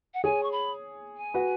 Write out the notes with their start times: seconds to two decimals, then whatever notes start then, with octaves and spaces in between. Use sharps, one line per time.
0.14 F#5
0.24 G#4 C#5 G#5
0.43 C#6
0.52 B5
1.17 G#5
1.34 F#4 B4